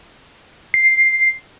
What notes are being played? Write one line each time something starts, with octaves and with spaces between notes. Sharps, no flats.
C7